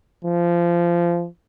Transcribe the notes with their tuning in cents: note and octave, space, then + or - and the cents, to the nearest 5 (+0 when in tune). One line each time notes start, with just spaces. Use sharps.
F3 -20